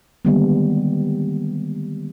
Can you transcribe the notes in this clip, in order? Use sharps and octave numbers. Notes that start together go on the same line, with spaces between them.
D3 D#3 G3 G#3 A#3 B3